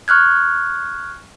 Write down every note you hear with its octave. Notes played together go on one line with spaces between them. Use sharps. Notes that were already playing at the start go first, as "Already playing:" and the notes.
C#6 F6 F#6 G#6